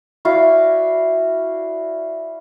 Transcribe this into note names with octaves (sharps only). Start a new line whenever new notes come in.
E4 F#4 D5 F5